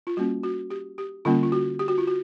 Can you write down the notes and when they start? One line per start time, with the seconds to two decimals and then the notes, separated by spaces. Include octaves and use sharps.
0.07 F4
0.17 G3 A#3 C#4 F#4
0.43 F#4
0.70 G4
0.98 G4
1.25 D3 G3 A#3 C#4 F4
1.43 F4
1.52 F#4
1.79 G4
1.88 F#4
1.98 F4
2.07 F#4